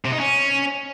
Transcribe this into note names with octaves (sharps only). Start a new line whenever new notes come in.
C3
D#4
C#4